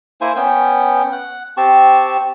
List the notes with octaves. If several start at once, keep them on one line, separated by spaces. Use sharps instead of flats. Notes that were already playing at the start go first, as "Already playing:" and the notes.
A#3 E4 C5 G#5
B3 C#4 G5
F#5
C4 G4 A5 C#6